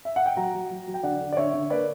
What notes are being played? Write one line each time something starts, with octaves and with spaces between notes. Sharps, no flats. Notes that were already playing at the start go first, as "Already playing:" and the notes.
E5
F#5
G5
F#3 F#5 A#5
F#3
F#3
F#3
G5
D3 D5 F#5
D3
D5
D3 C#5 E5
D3
A#3 B4 D5